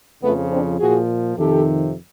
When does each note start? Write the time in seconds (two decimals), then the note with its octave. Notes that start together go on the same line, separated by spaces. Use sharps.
0.23 F2 C#3 F3 A3 B3
0.51 C4 D4
0.80 A#2 F3 F#4 G#4
1.36 F2 C3 D#3 G4 A4